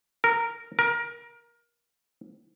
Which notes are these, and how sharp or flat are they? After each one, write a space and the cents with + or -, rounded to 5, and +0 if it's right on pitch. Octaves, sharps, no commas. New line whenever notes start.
A#4 -10
A#4 +20